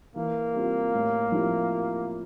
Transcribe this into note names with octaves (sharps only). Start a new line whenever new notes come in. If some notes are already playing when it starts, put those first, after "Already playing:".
E3 A#3
G3 C4 F4
A2
F3 C4 E4 G4